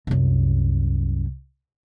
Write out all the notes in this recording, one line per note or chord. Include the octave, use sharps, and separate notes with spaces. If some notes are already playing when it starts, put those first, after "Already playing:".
C2 F#2